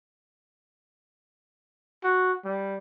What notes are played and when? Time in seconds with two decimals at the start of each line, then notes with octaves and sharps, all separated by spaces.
2.03 F#4
2.44 G3